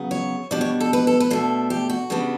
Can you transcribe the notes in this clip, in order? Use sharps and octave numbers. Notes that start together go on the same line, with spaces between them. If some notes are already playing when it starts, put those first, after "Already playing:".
Already playing: C#3 F#3 B3
C#5
B2 G3 D4 D5
C#5
A4
B4
A4
B4
B2 A3 D4 A4
G4
F#4
C#3 G3 B3 D4